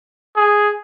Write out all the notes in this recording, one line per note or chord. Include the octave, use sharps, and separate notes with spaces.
G#4